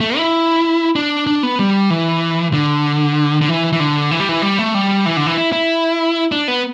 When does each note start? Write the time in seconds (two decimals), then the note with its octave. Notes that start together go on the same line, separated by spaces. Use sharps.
0.01 A3
0.17 E4
0.96 D4
1.27 D4
1.43 B3
1.59 G3
1.90 E3
2.53 D3
3.41 D3
3.49 E3
3.73 E3
3.80 D3
4.11 E3
4.20 G3
4.29 E3
4.42 G3
4.59 A3
4.74 G3
5.06 E3
5.17 D3
5.26 E3
5.38 E4
5.53 E4
6.32 D4
6.48 B3